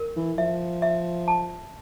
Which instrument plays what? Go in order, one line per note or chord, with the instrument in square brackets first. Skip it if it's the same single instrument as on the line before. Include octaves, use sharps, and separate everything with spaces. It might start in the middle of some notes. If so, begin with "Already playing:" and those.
Already playing: [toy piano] A#4
[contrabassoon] E3
[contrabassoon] F3 [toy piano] E5
[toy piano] E5
A5